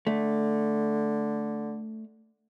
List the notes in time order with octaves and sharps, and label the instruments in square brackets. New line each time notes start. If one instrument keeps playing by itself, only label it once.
[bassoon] D3 [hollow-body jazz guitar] A3